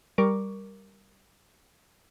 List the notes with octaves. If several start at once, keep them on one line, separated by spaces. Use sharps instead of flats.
G3 A#4 C#6 D6